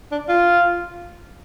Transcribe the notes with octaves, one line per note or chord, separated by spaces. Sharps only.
D4
F4